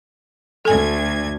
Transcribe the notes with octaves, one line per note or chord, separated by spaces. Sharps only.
D2 A4 G#5 G#6